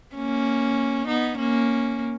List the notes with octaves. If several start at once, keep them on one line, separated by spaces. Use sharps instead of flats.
A#3 C#4
B3 D#4
A#3 C#4